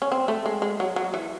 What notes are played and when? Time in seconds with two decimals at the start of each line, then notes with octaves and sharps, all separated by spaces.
0.02 C#4
0.12 C4
0.28 A3
0.46 G#3
0.62 G#3
0.80 F#3
0.96 F#3
1.14 E3